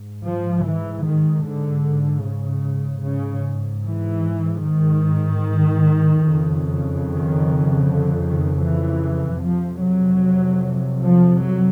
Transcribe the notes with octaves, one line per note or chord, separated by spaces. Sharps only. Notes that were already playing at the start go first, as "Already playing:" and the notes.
Already playing: G#2
F3
E3
D#3
D3
C#3
G#2 C#3
E3
D#3
F2 C#3
D#3
D3
D#3
E3
F2 C3 F3
F#3
F3
F#3